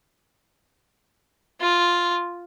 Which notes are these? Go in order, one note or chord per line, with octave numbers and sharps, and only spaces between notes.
F4